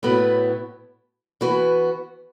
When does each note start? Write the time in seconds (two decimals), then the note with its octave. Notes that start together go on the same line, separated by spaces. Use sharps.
0.03 A2 F#3 B3 E4 B4
1.41 E3 B3 F#4 B4